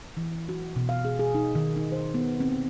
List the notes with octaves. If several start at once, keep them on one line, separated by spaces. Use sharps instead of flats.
E3
F#4
B2
F5
G#4
G#4
D#4
D#3
D#4
C5
B3
C4